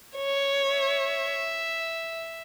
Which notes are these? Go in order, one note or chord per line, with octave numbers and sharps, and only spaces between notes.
C#5
E5